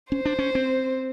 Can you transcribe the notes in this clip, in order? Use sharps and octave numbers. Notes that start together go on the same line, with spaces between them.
C#4 C5
D4
C#4
C4